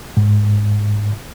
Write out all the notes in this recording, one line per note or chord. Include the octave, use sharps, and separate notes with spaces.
G#2